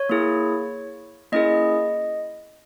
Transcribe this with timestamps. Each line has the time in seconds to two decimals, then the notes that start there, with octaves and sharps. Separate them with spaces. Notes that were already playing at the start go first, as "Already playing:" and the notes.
Already playing: C#5
0.09 A#3 E4 G#4
1.32 A#3 C#4 E4 G#4 D#5